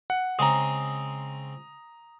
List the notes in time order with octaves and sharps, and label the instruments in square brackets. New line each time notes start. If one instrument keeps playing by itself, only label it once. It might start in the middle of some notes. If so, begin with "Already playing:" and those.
[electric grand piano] F#5
[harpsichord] C#3 G#3 C4 [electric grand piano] A#5 D#6